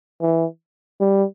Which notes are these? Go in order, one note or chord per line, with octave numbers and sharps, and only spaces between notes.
E3
G3